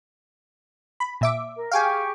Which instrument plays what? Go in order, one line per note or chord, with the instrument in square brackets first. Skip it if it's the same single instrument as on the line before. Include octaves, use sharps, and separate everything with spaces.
[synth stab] B5
A#2 E5 D6
[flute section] A#4
[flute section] G4 G#4 C#6 [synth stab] F5 G5 G#5